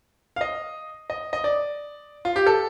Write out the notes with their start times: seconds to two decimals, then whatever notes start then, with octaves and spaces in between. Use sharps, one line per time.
0.36 F5
0.41 D#5
1.10 D#5
1.33 D#5
1.44 D5
2.25 F4
2.36 G4
2.47 A4